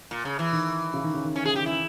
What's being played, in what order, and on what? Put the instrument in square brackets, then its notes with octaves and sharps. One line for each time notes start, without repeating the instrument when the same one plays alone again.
[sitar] A#2
C#3
E3
[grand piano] D#3
C#3
D#3
C#3
D#3
[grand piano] E3 [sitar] C#4
[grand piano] C#3 [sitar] G#4
[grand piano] D#3 [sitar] G4
[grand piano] E3 [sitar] E4